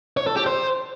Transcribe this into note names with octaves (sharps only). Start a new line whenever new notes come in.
C#5
A4
G4
C5